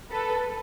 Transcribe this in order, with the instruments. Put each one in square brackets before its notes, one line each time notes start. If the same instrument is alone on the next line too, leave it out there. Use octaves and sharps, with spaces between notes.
[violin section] A4 B4